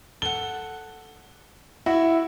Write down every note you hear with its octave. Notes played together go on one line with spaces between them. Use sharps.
A4 F#5 G7
E4 F#4 E5